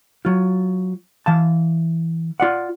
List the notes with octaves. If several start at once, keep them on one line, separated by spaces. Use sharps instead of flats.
F#3 F4
E3 F5 A5
F4 D5 F#5